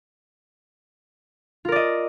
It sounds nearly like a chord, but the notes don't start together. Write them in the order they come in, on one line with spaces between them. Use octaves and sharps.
F4 A#4 D5 D#5